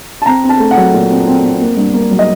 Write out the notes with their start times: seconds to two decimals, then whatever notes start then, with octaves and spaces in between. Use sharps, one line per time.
0.22 A5
0.26 C4 A#5
0.43 C4
0.49 A5
0.60 A3
0.71 F#5
0.77 F#3
0.94 A#2
1.10 C4
1.27 C4
1.44 C4
1.61 A#3
1.77 G2
1.94 A#3
2.11 F#3
2.19 D#5